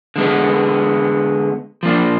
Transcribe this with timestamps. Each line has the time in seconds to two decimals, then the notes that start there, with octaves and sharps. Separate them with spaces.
0.16 D3 G#3 B3
1.83 F3 A#3 D4